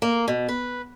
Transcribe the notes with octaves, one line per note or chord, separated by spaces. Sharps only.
A#3
B2
B4